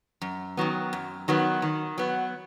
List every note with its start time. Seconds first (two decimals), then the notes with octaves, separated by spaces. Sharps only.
0.21 F#2
0.57 D#3 F#3 B3
0.93 F#2
1.28 D#3 F#3 B3
1.62 D#3
1.98 F#3 B3